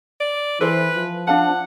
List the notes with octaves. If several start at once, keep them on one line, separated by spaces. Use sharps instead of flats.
D5
E3 A4 B4 C5
F3
D4 F5 F#5 A5